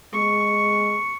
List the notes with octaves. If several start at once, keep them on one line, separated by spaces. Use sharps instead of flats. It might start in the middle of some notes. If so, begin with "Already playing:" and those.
G#3 C#6